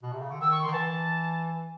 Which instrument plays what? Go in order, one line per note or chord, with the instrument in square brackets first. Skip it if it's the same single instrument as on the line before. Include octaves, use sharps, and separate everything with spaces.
[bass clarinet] B2
C3
C#3
D3
[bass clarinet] D#3 [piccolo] E6
[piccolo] C#6
[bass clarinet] D#3 [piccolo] C6
[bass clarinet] E3 [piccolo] A5